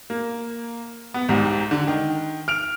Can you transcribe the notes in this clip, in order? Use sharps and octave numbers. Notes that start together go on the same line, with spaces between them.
A#3
B3
C2 G#2 C3
D3
D#3
F6 D7 F7